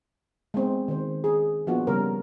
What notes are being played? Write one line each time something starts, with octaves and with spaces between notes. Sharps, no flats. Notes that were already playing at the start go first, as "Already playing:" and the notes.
G#3 B3 C4
D#3 C5
G#4
F3 A#3 B3 D4 F4 F#4
C#3 G3 B3 A#4 C#5